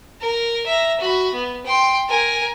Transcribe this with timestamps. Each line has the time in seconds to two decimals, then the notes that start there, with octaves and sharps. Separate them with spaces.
0.21 A#4
0.66 E5 A#5
1.00 F#4 B5
1.33 B3
1.66 G5 C6
2.08 A#4 G#5